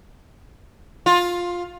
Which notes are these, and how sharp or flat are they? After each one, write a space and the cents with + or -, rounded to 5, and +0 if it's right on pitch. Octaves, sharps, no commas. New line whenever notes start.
F4 +10